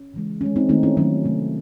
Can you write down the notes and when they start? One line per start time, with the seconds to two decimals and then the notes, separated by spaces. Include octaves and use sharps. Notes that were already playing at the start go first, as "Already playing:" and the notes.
Already playing: C#4
0.14 C#3 E3 G#3
0.41 D#3 G#3 C#4
0.56 C4 D#4
0.69 D#3 A3 C4 D#4
0.83 C#4 E4
0.97 D#3 F#3 A3 C#4
1.25 C3 F#3 A3